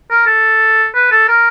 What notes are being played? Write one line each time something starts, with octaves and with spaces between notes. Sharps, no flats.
A#4
A4
B4
A4
A#4